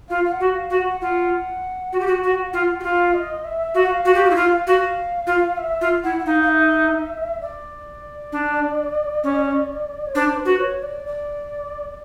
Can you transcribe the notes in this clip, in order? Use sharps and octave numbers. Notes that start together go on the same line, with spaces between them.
F4 F5
F5
F#5
F#4
F5
F#4
F#5
F4 F#5
F#4
G4
F#4
F#4
F4
F#4
F4 F5
D#5
E5
F#4 F5
F#5
F5
F#4
G4
F#4
E4
F4
F#4 F5
F4
E5
F4
E4 F#5
F#5
D#4 F5
F5
E5
D5
D4
C#4
C#5
D4 C5
B4
F#4
C#5
D5
D5